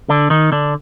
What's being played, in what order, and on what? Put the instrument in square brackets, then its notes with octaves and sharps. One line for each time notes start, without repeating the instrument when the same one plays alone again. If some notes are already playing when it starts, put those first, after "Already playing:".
[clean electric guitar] D3 D4
D#3 D#4
D3 D4